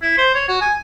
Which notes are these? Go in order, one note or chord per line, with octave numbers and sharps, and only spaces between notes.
E4
C5
C#5
F#4
G#5